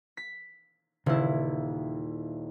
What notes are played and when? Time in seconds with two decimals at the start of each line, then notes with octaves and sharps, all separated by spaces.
0.17 B6
1.06 D#1 C#3 E4